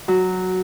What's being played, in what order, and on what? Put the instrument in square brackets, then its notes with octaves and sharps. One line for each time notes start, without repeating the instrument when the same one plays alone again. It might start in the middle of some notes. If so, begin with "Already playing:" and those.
[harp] F#3